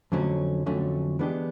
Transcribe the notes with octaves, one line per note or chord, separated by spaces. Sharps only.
F2 D3 F#3 A3 C#4
F2 D3 F#3 A3 C#4
E3 G#3 B3 D4 G4